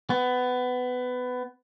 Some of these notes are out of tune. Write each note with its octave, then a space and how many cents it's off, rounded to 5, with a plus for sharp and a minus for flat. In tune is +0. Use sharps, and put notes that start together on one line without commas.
B3 +20